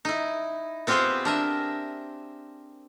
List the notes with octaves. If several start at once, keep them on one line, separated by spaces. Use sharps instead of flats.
D#4 E4
B3 C4 F4 G4 G#4 C5
D4 A#4 E5